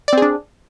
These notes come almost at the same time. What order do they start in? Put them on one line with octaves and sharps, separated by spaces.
D5 C4 G#4 D4